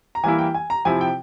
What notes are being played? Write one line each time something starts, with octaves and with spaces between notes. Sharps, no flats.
A#5
E3 G3 A#3 E4 G#5
G5
G#5
A#5
C3 F3 C4 E4 G#5
G5